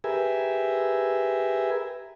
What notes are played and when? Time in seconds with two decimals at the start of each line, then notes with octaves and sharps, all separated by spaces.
0.04 G4 G#4 A#4 B4 E5 G#5